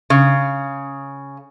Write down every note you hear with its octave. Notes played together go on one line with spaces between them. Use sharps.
C#3